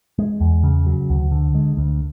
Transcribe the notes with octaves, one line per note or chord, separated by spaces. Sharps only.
G#3
E2
C#3
F#3
D2
D3
G#3
D2